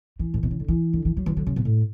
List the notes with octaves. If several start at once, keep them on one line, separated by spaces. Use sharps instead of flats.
E3
A2
B2
C#3
D3
E3
D3
E3
F#3
E3
D3
C#3
B2
A2